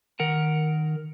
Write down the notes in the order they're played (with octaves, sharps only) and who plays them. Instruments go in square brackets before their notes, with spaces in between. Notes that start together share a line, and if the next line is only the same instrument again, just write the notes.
[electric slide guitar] D#3 A#4 F#5